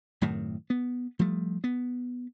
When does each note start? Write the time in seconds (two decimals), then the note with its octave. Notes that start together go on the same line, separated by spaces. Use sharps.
0.21 F#2 A2 C3 D#3
0.70 B3
1.19 F3 G3 A3
1.64 B3